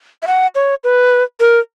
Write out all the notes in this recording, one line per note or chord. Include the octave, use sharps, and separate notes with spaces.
E5
F#5
C#5
B4
A#4